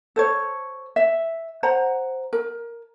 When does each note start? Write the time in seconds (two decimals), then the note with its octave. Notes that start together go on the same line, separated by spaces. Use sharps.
0.16 A4 C5 C#5
0.96 E5
1.63 C5 F#5 A#5
2.33 A#4